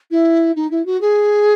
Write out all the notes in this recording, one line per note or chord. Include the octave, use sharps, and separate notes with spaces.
E4
D#4
E4
F#4
G#4